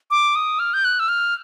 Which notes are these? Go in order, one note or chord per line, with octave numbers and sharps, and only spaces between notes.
D6
D#6
F6
G6
F#6
E6
F6